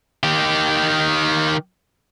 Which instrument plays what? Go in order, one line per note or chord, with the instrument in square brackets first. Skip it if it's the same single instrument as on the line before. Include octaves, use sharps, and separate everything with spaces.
[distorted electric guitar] D#3 G4